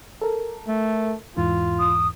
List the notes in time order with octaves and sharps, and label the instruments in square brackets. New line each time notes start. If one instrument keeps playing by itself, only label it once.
[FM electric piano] A4 A#4
[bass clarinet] A3
[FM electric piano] E2 G#2 E3 [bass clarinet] F4
[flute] D#6